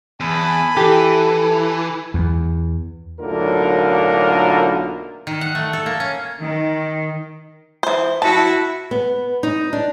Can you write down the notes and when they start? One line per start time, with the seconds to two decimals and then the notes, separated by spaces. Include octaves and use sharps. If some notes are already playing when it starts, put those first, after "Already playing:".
0.20 E2 G#5 A5 B5
0.77 E3 G4 A4
2.14 E2
3.20 B1 A2 D3 A#3 F4 A#4
5.27 D#3
5.41 F#5
5.55 A3
5.73 A4
5.86 A#3
6.00 C#4
6.41 D#3
7.83 E3 C5
8.22 E4 F#4 A5
8.91 B3
9.43 D#4
9.73 D4